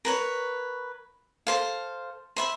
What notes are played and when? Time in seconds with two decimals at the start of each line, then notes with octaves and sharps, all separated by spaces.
0.05 A#4 B4 C#5
1.47 A4 C5 F5
2.36 C5 E5 B5